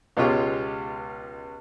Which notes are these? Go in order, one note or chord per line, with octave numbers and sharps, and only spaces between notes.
C#2 B2 G#3 F4 G4 C#5